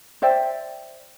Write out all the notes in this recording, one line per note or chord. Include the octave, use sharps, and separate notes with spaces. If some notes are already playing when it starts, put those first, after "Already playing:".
C5 D5 E5 G5